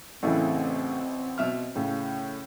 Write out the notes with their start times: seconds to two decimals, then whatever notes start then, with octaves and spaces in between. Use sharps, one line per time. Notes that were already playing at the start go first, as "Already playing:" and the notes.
0.23 A1 A2 C#3 E3 C4 E4
1.38 B2 E5 F6
1.76 A2 C#3